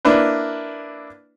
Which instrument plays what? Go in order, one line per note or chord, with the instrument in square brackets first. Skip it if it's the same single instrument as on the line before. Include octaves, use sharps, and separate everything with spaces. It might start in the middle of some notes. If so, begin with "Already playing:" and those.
[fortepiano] A#3 D4 E4 B4